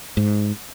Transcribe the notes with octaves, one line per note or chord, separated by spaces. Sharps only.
G#2